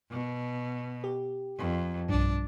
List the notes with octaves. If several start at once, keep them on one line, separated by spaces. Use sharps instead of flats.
B2
G4
F2
B1 G2 D4